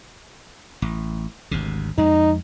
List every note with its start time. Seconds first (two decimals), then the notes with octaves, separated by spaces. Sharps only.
0.82 A1
1.51 G#1 D2 C3
1.98 F2 G#3 D#4